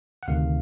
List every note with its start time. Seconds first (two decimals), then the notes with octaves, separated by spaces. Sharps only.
0.23 F#5
0.28 D2 C3 D#3 F5